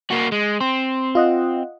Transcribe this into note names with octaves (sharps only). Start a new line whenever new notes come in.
A#3 F#4
G#3
C4 C6
F4 D#5 F#5